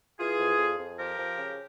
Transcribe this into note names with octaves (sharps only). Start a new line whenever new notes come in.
E3 F4 G#4
F2
F2
F2
F3 G4 A#4
F3
C#3